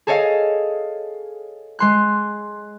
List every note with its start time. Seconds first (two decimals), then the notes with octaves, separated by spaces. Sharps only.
0.07 G#4 A4 C#5 D#5 F5
1.79 G#3 C6 F#6